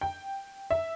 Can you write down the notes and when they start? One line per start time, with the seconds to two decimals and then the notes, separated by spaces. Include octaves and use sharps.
0.01 G5
0.70 E5